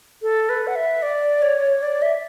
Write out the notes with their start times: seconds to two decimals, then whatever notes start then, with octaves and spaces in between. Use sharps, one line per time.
0.22 A4
0.49 B4
0.67 F#5
0.76 E5
1.02 D5
1.42 C#5
1.82 D5
2.02 E5